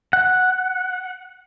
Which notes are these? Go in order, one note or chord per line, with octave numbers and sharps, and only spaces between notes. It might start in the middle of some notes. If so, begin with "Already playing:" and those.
F#5